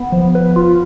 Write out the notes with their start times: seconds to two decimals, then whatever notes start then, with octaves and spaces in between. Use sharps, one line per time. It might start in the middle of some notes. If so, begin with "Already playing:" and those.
Already playing: B3
0.12 F3
0.35 B4
0.56 F4